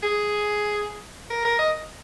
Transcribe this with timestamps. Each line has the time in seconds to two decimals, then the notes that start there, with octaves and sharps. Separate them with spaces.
0.03 G#4
1.30 A#4
1.45 A#4
1.59 D#5